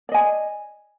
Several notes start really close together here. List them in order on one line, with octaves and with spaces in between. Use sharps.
D5 D#5 G#5